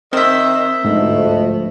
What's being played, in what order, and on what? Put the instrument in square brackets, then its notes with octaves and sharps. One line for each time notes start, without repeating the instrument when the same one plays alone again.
[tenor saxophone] D#3 [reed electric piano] C4 [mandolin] C5 E5
[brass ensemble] D2 F3 A3 [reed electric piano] G#2 [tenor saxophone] B2